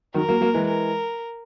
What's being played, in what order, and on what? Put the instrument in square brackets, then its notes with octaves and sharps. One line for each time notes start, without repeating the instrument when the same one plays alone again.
[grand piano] D#3 F#3 [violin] A#4
[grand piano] F#3 A#3
F#3 A#3
E3 G#3
[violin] A#4